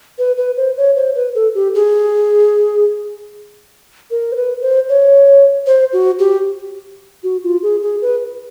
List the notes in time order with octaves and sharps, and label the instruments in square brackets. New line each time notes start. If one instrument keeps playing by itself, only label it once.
[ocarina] B4
B4
C5
C#5
C5
B4
A4
G4
G#4
A#4
C5
B4
C5
C#5
C5
F#4
G4
F#4
F4
G#4
G#4
B4